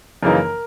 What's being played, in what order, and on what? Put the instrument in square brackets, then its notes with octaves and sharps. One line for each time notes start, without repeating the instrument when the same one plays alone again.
[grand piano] F#2 C#3 E3 A#3 D#4 A#4